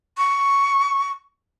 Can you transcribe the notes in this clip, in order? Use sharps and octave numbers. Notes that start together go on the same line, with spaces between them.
C#6